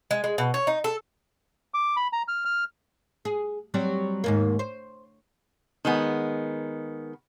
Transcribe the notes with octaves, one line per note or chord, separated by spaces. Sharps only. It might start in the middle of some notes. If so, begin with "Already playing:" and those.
G#3
G#3
B2
C#5
D#4
A4
D6
B5
A#5
F6
F6
G#4
F#3 G3 C4
D#2 G#2 A#3
C5
D#3 G#3 B3